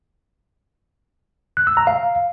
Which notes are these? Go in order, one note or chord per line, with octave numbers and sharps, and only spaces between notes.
F#6
E6
A#5
F5